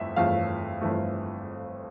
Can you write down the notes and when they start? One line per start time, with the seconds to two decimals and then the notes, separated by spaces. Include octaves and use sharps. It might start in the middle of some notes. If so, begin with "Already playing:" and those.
Already playing: G1 F2 E3 A3 E5
0.16 G1 F2 E3 A3 F5
0.81 G1 F2 E3 A3